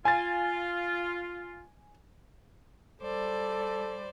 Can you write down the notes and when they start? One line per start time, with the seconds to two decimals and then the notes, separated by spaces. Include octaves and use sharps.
0.05 F4 G#5 A6
3.02 G3 A4 C5 D5